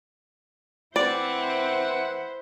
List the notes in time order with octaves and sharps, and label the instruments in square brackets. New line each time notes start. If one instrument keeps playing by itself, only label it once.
[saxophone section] E3 E5 F#5 [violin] C4 [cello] E4 C5 [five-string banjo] D5